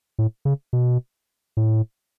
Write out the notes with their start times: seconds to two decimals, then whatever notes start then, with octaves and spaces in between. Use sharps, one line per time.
0.19 A2
0.45 C#3
0.73 B2
1.57 A2